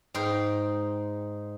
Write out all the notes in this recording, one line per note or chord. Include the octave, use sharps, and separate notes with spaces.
G#2 D#4 G5 C6